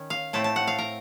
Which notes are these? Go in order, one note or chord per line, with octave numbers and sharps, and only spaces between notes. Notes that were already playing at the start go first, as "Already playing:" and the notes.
Already playing: D#3 C#4
F5
A2 A3 C4 A5
A5
F#5
F5
A#4